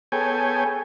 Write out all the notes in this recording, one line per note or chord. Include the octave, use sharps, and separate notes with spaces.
B3 G#4 A4 C#5 G5 G#5